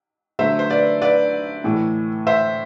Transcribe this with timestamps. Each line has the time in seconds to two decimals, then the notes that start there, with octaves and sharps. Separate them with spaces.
0.39 D3 F#3 A3 C5 E5
0.59 C5
0.70 B4 D5
1.01 B4 D5
1.64 A2 E3 A3
2.27 C5 E5